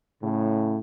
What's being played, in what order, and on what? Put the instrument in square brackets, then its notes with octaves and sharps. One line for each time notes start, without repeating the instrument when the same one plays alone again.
[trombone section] A2 C#3